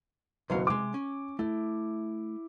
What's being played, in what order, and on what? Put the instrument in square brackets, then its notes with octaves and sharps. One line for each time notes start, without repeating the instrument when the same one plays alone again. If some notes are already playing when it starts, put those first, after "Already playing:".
[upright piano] F#1 B2 [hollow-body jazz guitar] D#2 F#3 F5
[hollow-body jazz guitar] C3 G#3 [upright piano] D6
[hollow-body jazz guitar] C#4
[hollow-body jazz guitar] A3 [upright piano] E4